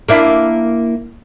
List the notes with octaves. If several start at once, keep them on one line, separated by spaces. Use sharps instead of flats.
A#3 D4 E4